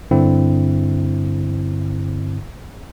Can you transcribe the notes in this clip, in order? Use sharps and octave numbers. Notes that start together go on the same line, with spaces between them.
G2 D3 C4 E4